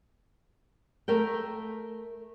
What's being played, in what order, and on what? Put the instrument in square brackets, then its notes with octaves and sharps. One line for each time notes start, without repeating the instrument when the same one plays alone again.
[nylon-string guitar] A3 A#4 G5